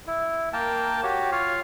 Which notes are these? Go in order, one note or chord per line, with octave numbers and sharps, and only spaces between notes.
E4
A#3 A#4 G5 A5
F#4 G4 C#5
F4 C#5 F5